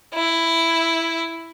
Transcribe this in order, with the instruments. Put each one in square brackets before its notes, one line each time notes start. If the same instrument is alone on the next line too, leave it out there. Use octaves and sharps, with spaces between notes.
[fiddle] E4